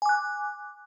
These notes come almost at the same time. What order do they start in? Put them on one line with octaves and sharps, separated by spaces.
G#5 D6 F#6